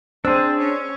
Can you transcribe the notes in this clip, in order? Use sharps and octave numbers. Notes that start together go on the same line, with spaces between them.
C4 D4 G#4 C5 E6
C#4